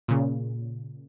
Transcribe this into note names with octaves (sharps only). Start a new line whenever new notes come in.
A#2 C#3